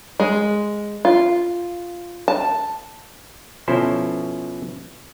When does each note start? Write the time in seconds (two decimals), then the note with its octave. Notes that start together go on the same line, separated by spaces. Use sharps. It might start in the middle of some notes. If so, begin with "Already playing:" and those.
0.20 G#3
1.05 F4
2.28 A5
3.68 B2 F3 C#4 E4 A4 C5